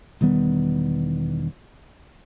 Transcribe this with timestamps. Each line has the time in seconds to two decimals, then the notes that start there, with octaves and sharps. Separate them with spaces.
0.21 E1 D#3 G3 B3